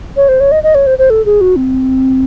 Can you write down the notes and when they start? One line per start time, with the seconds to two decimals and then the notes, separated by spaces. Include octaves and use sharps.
0.17 C#5
0.29 C5
0.40 C#5
0.52 D#5
0.63 D#5
0.75 C#5
0.87 C5
0.99 C5
1.10 A4
1.26 G#4
1.41 F#4
1.56 C4